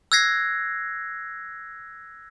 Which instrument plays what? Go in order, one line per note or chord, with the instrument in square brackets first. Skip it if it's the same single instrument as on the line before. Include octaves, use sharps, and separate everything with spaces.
[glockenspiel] E6 F#6 G#6 A#6 C7